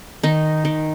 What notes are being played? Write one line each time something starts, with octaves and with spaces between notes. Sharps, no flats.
D#3 D#4
D#3